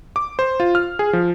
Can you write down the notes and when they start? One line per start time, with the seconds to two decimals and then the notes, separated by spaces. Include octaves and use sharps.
0.16 D6
0.39 C5
0.60 F4
0.75 F6
0.99 G#4
1.13 F3